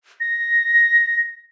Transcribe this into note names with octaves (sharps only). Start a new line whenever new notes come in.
A#6